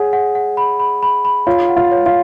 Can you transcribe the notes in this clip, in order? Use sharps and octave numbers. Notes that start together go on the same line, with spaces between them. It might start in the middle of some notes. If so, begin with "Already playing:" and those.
Already playing: G#4 C#5 F#5
F#5
F#5
B5
B5
B5
B5
F4 C#5
F#5
F4
C#5
F4